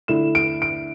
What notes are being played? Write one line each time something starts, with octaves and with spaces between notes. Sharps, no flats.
D3 A3 E4 E7
D7
D7